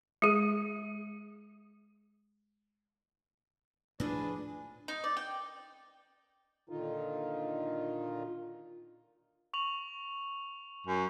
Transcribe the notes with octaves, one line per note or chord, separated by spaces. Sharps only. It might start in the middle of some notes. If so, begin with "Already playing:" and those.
G#3 G#4
A2 F3 D4 G#4 B4
D#4
D5
G5
A#2 D3 D#3 D#4 F4
C#6 F7 F#7
F#2